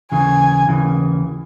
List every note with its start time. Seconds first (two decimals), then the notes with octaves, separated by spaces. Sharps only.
0.12 D#2 C#3 E3 G#5
0.69 D#2 C#3 E3